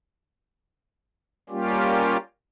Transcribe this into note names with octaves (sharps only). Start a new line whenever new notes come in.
G3 A#3 C#4 F4 G4